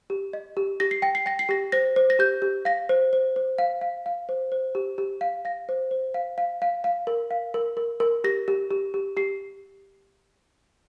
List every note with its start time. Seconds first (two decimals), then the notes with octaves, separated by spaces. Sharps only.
0.10 G4
0.33 D#5
0.57 G4
0.80 G4 A#6
0.91 C7
1.02 G5 A#6
1.15 C7
1.26 G5 A#6
1.39 C7
1.49 G4 A#6
1.72 C5 A#6
1.96 C5
2.10 A#6
2.19 G4 G6
2.42 G4
2.65 F5 A#6
2.89 C5
3.13 C5
3.36 C5
3.58 F5
3.81 F5
4.06 F5
4.29 C5
4.52 C5
4.75 G4
4.98 G4
5.21 F5
5.45 F5 A#6
5.69 C5
5.91 C5
6.14 F5
6.38 F5
6.62 F5
6.84 F5
7.07 A#4
7.31 F5
7.54 A#4
7.77 A#4
8.00 A#4
8.24 G4 A#6
8.48 G4
8.71 G4
8.94 G4
9.17 G4 C7